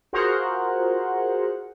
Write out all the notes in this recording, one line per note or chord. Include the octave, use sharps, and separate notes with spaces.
F4 F#4 G#4 A#4 C5 F#5